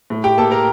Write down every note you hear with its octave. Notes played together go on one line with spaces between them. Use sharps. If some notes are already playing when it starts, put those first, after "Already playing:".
A2
G4 G5
A#3 A4 A5
A#4 A#5